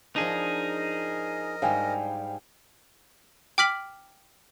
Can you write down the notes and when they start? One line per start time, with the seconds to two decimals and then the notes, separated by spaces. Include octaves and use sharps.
0.16 F3 D4 D#4 G#4 A#4 D#5
1.62 G#2 G3 F5 G5 G#5
3.58 G5 D6 F6 B6 F#7